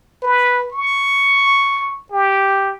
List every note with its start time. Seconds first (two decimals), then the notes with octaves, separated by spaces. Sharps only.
0.23 B4
0.72 C#6
2.12 G4